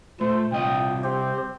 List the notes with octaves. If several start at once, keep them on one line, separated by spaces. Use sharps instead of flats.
A#2 A3 C5
C2 D#5 G5
C4 G4 C5